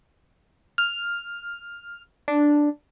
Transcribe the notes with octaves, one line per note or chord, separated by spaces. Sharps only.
F6
D4